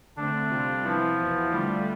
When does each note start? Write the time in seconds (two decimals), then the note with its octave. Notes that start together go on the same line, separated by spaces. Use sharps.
0.17 D3 A3 C4 D4
0.50 C3 G3 C4 F4
0.84 C3 E3 F3 B3 E4
1.18 E2 B2 B3 E4
1.51 D3 G3 A3 D4 F4